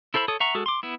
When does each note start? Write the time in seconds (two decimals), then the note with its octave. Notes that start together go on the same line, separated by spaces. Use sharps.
0.14 E4 A4 C5 E5 B5
0.28 A4 C#5 D#6
0.40 E5 F#5 A#5 C#6
0.55 G#3 F#4 G#4 A4
0.66 C6 D6
0.83 B3 E4